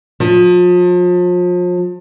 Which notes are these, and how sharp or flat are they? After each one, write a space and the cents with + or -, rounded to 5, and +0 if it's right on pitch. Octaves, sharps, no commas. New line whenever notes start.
F3 +35